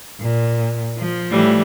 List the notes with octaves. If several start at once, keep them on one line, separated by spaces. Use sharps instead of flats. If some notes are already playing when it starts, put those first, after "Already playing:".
A#2
F3
A2 E3 G3